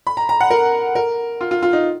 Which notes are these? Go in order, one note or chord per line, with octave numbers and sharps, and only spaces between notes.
B5
A#5
A#5
F#5
A#4
A#4
F4
F4
F4
D#4